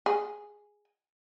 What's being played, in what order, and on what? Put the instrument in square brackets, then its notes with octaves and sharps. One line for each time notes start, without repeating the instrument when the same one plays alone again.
[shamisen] G#4